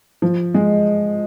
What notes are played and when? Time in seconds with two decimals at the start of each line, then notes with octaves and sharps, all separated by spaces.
0.22 F3
0.54 G#3